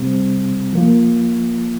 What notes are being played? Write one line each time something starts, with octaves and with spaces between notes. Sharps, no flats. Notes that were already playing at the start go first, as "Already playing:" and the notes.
Already playing: C3 G3 C4
F3 A#3 F4